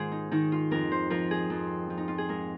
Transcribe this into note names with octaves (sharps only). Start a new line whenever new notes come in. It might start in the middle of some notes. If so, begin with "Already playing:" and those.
Already playing: G#2 D#3 F4 G#4 A#4 C5
D#4
D#3 D#4
F4
F2 A#4
C5
F3 A#4
G#4
F2
F3
D#4
F4
G#4
G#2 A#4